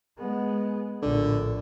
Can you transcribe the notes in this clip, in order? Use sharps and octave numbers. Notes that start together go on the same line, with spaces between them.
G#3 B3
A#1 A2 D3